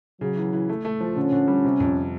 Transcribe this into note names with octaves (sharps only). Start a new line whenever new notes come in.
C#3 F#3
E3
E3
A3
A3
F3
D3 C#4
D3
G3
C3
F2